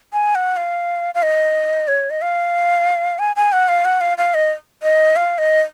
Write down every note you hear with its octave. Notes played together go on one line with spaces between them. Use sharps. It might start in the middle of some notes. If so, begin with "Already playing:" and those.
G#5
F#5
F5
F5
D#5
C#5
D#5
F5
G#5
G#5
F#5
F5
F#5
F5
F5
D#5
D#5
F5
D#5